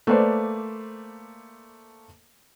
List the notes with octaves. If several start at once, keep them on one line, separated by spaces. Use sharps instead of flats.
A3 A#3 B4 C5 D5